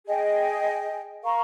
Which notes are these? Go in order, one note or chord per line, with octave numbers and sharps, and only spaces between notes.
G#4 D#5 G5
A#4 F5 A#5 C#6